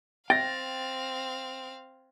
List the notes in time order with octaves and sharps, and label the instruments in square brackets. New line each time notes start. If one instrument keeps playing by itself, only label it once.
[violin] C4 F5 [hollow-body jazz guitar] G5 [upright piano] A6 A#6